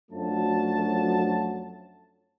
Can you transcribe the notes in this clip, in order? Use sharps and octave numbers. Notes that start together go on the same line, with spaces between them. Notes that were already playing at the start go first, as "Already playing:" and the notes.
F#2 F3 F#3 A3 D4 A5